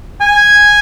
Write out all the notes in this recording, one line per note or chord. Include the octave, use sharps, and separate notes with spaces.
G#5